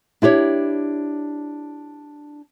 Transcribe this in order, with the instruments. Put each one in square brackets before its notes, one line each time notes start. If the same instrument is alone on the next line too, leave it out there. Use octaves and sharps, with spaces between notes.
[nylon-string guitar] D4 E4 G4 C#5